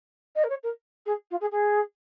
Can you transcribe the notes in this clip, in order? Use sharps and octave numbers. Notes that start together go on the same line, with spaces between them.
D#5
A#4
C#5
A#4
G#4
F4
G#4
G#4